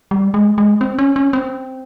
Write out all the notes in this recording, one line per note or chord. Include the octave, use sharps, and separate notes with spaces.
G3
G#3
G#3
C4
C#4
C#4
C4